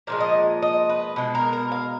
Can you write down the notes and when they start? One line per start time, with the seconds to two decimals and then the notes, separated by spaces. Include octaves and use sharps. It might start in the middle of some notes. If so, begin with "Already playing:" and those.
0.07 A#2 F3 G#3 F5
0.20 D#5
0.62 D#5
0.89 B4
1.16 B2 G#3
1.35 A#4
1.53 A#4
1.72 F5